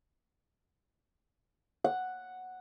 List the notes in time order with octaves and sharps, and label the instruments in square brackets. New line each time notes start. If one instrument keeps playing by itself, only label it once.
[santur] F#5